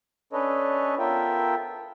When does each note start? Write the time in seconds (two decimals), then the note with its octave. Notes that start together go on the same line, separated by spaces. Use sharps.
0.33 C#4 D4 A4 B4 C#5 D#5
0.99 B3 F4 A4 A#4 E5 G5